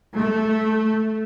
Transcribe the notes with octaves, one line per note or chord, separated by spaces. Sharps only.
A3